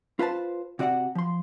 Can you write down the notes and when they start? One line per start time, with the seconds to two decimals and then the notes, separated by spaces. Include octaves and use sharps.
0.19 F4 B4 C5 A5
0.79 C3 F#4 D5 F5 F#5
1.15 F3 C6